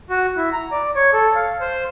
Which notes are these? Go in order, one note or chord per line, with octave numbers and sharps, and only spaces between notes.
F#4
E4
A#5
D5
C#5
A4
F5
C5